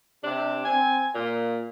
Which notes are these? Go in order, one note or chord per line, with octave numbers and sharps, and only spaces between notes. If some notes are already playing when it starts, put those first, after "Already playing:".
C3 D4
C4 G#5
A#2